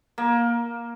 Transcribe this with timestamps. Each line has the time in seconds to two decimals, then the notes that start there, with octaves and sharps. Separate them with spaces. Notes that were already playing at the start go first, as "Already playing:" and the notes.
0.18 A#3